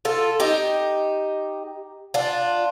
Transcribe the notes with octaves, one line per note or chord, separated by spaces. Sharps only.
F4 A4
D#4 G4
D4 F4